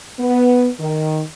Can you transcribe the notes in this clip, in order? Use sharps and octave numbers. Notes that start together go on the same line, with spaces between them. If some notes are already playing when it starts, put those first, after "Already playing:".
B3
D#3